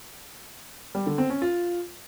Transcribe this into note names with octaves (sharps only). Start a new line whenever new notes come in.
G3
D3
C4
C#4
F4